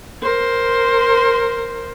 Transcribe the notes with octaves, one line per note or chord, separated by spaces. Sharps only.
A#4 C5